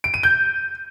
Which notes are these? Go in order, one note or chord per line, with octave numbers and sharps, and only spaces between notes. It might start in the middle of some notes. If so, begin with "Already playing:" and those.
D7
D#7
G6